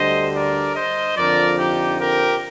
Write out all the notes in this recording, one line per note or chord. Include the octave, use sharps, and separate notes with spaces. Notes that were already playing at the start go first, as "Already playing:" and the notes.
Already playing: D2 D3 G3 C5 D#5
A#4 D5
C5 D#5
F2 D3 F3 A#4 D5
D#4 G4
G4 A#4